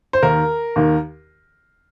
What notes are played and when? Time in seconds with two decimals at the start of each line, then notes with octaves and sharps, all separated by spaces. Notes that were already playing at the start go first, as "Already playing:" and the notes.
0.13 C5
0.22 D#2 D#3 A#4
0.76 D#2 D#3